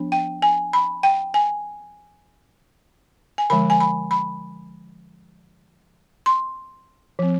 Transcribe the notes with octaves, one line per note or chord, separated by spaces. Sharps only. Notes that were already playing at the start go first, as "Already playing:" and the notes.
Already playing: F3 B3 D4
G5
G#5
B5
G5
G#5
G#5
D3 F3 G#3 B5
G#5
B5
B5
C6
F3 C4